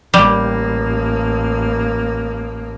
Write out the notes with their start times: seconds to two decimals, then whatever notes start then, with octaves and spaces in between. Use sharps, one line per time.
0.14 A1 G3 A#3